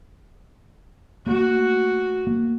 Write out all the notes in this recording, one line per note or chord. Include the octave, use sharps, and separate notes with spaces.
A3 A#3 F#4
A#3